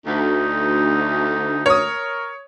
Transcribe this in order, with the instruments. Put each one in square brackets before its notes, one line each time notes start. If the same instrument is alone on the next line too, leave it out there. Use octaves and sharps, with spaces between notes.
[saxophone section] D2 [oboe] D#4
[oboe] A#4 [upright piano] C#5 D#6